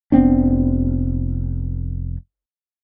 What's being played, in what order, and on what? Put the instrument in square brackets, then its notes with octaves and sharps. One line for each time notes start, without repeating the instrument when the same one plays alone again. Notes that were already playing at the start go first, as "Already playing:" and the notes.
[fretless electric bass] F1 B3 C4 D4